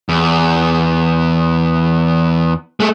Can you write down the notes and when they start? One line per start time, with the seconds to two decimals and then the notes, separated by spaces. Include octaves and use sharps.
0.09 E2
2.80 G#3 A3